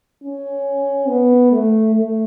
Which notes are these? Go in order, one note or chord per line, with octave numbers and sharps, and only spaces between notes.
C#4
B3
A3
A3